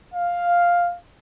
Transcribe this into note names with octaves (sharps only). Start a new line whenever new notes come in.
F5